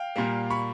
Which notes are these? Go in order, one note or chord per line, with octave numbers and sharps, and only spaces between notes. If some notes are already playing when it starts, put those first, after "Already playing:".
Already playing: F5 G5
A#2 G3 A#3
B5 C#6